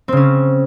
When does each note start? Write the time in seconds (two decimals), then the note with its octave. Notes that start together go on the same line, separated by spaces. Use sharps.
0.08 C4
0.12 C#3
0.17 C#4